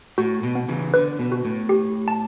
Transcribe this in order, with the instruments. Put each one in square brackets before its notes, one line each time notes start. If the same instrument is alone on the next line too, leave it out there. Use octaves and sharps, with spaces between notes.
[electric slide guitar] A2 [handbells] F#4
[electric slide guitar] B2
[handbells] B3
[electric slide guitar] C#3 E3
[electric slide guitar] D3 [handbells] B4
[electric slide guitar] B2
[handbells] F#4
[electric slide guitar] A2
[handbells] G4
A5